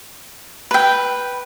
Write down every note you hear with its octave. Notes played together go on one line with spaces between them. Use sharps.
B4 G5